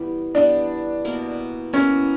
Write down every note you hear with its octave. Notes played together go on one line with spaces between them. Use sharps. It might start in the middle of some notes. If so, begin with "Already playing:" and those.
Already playing: E3 G3 B3
E3 G3 B3 D4
B2 A#3 E4 A#4
B2 A#3 C#4 E4 A#4